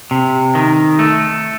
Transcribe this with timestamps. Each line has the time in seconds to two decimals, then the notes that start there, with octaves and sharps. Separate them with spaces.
0.11 C3
0.55 D#3
0.99 A3